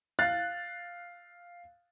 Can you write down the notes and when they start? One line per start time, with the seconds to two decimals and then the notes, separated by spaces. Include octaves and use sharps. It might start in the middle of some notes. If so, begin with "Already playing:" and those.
0.19 F5 F#6 A6